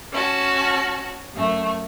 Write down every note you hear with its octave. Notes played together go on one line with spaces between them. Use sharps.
C#4 F#4 A5
F#2 A3